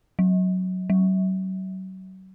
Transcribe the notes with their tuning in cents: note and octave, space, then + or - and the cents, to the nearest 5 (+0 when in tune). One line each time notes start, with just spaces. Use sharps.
F#3 +0
F#3 +35